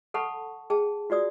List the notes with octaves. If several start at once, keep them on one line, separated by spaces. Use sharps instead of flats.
A4 F#5 A5 B5 C#6
G#4 G5 A5
F4 F#4 D5 D#6